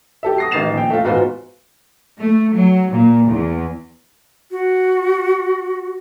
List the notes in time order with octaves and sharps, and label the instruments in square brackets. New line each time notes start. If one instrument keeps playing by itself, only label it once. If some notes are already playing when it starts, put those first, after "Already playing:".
[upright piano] G4 A4 E5
D#6 A#6 C7
A1 D#3 A6 C7 E7 F7
A#1 G5
A3 F4
E2 G#2 F4 F#4 B4 C5
[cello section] A3
F#3
A#2
E2
[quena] F#4